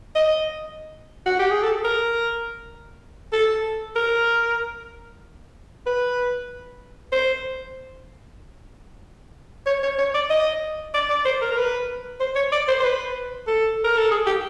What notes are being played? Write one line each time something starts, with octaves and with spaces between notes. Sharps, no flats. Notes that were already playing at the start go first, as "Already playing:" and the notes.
D#5
F#4
G4
G#4
A4
A#4
A4
A#4
B4
C5
C#5
C#5
C#5
D5
D#5
D5
D5
C5
A#4
A#4
B4
C5
C#5
D5
C5
C5
B4
A4
A#4
A4
G#4
G4